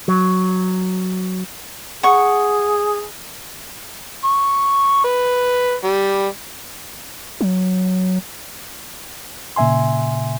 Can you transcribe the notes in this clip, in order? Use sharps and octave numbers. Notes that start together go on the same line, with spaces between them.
F#3
G#4 F#5 C#6
C#6
B4
G3
F#3
A#2 C#3 E5 G#5 C6